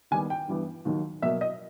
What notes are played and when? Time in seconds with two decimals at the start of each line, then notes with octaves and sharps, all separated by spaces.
0.11 D#2 D#3 G3 B3 G#5
0.30 G5
0.48 G2 E3 G3 B3
0.85 D#2 D#3 F#3
1.22 B2 F#3 A#3 E5
1.41 D#5